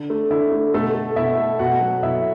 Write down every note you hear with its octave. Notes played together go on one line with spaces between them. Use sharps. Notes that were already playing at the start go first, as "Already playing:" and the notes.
Already playing: D3
A3
D3 E4
A3
B2 A3 A4
A3
B2 E4 E5
A3
B2 F#4 F#5
F#3 A3
B2 E4 E5